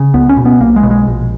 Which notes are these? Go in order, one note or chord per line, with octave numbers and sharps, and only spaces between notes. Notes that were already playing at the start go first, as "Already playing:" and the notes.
Already playing: C#3
C#2 B3
C#4
B2
B3
B1 A#3
G#3
B2
G#3
A#1